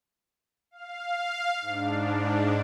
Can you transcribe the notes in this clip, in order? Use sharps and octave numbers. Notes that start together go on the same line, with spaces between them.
F5
G#2 D4